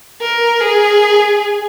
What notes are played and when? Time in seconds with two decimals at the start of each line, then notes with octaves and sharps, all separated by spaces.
0.21 A#4
0.60 G#4